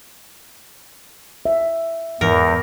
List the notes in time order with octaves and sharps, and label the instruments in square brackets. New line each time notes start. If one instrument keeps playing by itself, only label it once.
[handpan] E5
[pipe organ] E2 [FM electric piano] G#2 E3 C#7 [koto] A#4